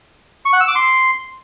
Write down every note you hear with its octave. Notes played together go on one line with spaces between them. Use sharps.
C#6
F#5
E6
D6
C6